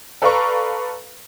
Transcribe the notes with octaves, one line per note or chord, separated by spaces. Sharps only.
A4 B4 D5 F5 A#5 C#6